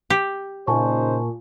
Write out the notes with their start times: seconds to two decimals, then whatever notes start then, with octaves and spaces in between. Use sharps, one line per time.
0.10 G4
0.67 A#2 C#3 D#4 C5 G#5 A5 C#6